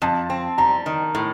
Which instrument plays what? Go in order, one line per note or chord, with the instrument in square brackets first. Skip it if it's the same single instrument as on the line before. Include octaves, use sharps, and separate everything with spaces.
[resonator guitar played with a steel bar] F2 [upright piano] A5
[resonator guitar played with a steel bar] C4
[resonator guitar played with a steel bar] G3 [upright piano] A#5
[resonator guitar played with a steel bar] D#3
A2